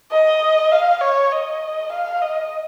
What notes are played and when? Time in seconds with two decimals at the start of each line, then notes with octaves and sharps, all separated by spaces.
0.12 D#5
0.72 F5
1.01 C#5
1.32 D#5
1.92 F5
2.21 D#5